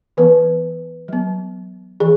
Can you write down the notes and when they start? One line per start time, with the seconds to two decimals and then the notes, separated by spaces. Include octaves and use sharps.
0.17 E3 B3 B4
1.08 F#3 B3
2.00 E3 G#4